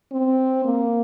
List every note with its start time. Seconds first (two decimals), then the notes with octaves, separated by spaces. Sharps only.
0.12 C4
0.65 A#3